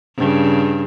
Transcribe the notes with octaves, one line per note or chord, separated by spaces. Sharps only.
G2 C#3